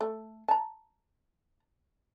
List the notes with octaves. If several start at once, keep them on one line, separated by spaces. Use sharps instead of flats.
A3
A5 A#5